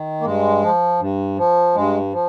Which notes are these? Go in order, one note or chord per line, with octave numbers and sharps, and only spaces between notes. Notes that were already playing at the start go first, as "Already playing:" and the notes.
Already playing: D#3
A#3
G2 G#3
F3
G2
F3
G2 G#3
F3